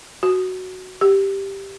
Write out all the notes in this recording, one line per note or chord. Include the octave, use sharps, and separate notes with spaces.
F#4
G4